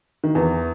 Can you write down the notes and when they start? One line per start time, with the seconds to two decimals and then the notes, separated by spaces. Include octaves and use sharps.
0.24 D#3
0.35 E2 E3